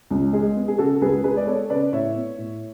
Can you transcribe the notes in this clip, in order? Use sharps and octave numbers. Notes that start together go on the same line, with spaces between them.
C#2
G#3 G#4
B3
G#4
C#3 F#4 A4
C#2 G#4 B4
G#3 G#4 B4
D5
B3 A4 C#5
C#3 B4 D5
A2 C#5 E5
B3
A2